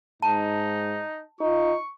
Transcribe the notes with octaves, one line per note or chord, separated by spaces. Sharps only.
G#2 D#4 A5
D#4 F4 C#6